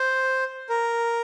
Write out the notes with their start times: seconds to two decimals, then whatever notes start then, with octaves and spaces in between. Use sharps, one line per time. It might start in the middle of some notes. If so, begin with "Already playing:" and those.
Already playing: C5
0.69 A#4